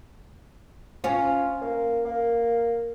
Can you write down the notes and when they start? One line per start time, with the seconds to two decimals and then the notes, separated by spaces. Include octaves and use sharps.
1.04 C#4 F4
1.62 A#3
2.05 A#3